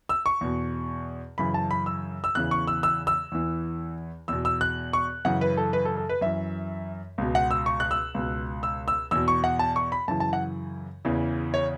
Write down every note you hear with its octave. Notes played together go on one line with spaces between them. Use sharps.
E6
C#6
E2 B2
F#2 C#3 E3 B5
A5
B5
E6
E6
E2 C#3 E3 F#6
C#6
E6
E6
E6
E2 E3
E2 B2 E6
E6
F#6
C#6
F#2 C#3 E3 F#5
B4
A4
B4
A4
A4
B4
F#2 E3 E5
C#2 B2
F#5
E6
C#6
F#6
E6
C#2 B2
E6
E6
E2 B2 E6
C#6
F#5
A5
C#6
B5
F#2 C#3 E3 A5
A5
F#5
E2 C#3 E3
C#5